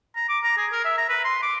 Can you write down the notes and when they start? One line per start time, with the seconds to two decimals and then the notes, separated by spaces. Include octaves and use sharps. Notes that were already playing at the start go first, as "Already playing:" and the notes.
0.16 A#5
0.29 D6
0.43 A#5
0.57 G#4
0.72 A#4
0.84 E5
0.98 A#5
1.09 B4
1.24 C6
1.42 D6